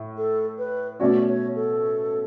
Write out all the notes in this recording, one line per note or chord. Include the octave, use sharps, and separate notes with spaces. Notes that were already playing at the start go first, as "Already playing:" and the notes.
Already playing: A2 E4
A4
B4
B2 A3 C#4 F#4 D5
C#5
A4